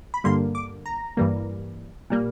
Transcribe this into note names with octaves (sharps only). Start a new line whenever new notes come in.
B5
G2 D3 G3 A#3 C6
D6
A#5
G2 E3 G3 A#3
A#2 G3 A#3